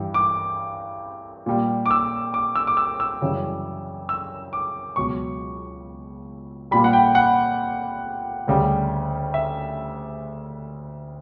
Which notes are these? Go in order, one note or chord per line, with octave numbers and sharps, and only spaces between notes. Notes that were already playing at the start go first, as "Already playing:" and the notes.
Already playing: G2 E3 G3
D6
A#2 G3
D6
E6
D6
E6
D6
E6
E6
F#2 C#3 E3 G3
E6
D6
C#2 B2 F#3 C#6
A#2 G3 B5
F#5
G5
F#5
D2 C#3 G3
E5